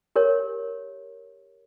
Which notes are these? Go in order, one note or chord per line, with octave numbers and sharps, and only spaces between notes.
G4 A#4 C#5